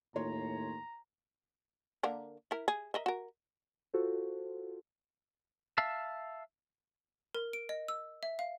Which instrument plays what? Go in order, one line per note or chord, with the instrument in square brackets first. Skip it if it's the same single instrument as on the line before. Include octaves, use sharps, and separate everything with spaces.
[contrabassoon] D#2 [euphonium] A2 [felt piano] F4 C#5 C6 [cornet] A#5
[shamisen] D3 A#3 A#4
E4 A#4
G#4
A#4 D#5 E5
F#4 A#4
[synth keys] F4 F#4 A4 C5
[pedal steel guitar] E5 F5 A5 E6
[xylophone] A#4
D7
D#5
E6
E5
F5